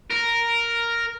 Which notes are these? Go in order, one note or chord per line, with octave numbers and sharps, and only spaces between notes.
A#4